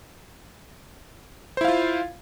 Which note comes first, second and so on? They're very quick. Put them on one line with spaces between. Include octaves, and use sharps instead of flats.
C5 E4 F5 F4